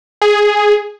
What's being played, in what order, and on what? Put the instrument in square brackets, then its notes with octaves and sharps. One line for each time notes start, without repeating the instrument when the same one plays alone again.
[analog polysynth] G#4